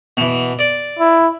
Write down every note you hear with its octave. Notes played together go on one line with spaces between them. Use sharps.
B2 E3
D5
E4